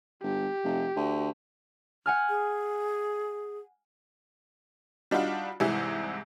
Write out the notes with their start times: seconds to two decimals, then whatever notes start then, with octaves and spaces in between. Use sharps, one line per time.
0.23 G1 G4
0.64 F1
0.96 D2
2.06 F#5 G#5 F6
2.29 G#4
5.11 G3 D4 D#4 F4 F#4
5.60 C2 G#2 C3 E3 G#4 E5